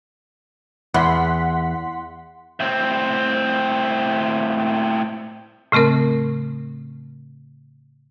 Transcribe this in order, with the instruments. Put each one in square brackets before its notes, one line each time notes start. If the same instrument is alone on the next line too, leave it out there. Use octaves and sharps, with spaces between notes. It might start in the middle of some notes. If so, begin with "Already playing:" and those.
[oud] E2 [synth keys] F#5 C6 B6
[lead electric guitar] A2 C4
[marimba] A2 C#3 A3 C4 A#4